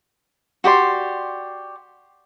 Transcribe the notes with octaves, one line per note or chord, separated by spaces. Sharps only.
F#4 G4 D5 C6